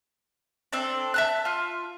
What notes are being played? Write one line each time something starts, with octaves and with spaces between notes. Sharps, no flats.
C4 D4 A4 D5
E5 A5 F#6
F4